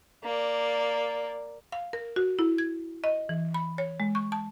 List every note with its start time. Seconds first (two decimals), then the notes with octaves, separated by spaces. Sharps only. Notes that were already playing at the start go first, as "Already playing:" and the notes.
0.24 A#3 D5
1.72 F5
1.93 A#4
2.16 F#4
2.39 E4
2.58 G#6
3.04 D#5
3.29 E3
3.54 B5
3.78 C#5
4.00 G#3
4.15 C#6
4.32 A5